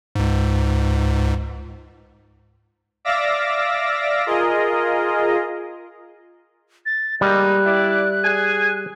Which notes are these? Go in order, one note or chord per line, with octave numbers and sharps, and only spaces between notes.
C#2 G#2
D5 E5 F5 D6 E6 A#6
F4 G#4 A#4 D#5
A6
G3 G#3 A#3 D#4 F#6
E4 D5
G#4 G#5